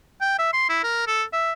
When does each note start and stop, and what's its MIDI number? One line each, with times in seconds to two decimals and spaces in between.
0.21 0.36 79
0.39 0.52 76
0.53 0.68 84
0.69 0.80 64
0.83 1.03 70
1.07 1.24 69
1.33 1.52 76